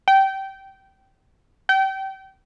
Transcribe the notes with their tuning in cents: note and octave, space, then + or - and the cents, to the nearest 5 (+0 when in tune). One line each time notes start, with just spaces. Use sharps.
G5 -20
G5 -30